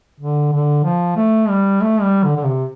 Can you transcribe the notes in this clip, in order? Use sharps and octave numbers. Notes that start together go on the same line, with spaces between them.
D3
D3
F3
A3
G3
A3
G3
D3
D3
C3